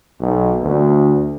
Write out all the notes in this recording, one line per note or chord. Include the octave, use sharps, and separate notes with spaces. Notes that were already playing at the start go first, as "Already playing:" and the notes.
B1
D2